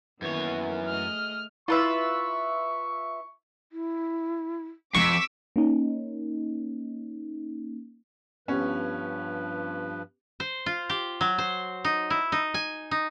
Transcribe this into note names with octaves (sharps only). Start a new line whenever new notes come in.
F#2 D#3 E3 A#3 B3 C#5
A3 G#4 D#5 F6
E4 F4 B4 E5 C#6
E4
F2 C#6 D6 E6 B6
A#3 C#4 D#4
G2 F3 B3 C#4 G4 B4
C5
F4
G4
F#3
C5
D#4
E4
D#4
G#5
D#4